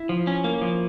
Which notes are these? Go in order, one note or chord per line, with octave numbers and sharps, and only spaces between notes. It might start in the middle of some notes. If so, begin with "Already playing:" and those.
Already playing: E4
F3
C#4
A#3
F3